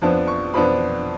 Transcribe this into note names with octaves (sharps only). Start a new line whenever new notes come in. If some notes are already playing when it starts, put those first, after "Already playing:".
F2 F3 B3 D4 A5
C#6
F2 F3 B3 D4 B5